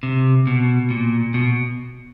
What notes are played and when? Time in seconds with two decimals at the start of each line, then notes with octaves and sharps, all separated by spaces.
0.03 C3
0.47 B2
0.90 A#2
1.34 B2